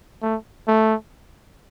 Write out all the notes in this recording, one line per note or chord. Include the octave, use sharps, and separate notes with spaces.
A3
A3